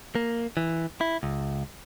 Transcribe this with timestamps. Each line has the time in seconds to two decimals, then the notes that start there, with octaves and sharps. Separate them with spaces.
0.15 A#3
0.57 E3
1.01 E4
1.23 C#2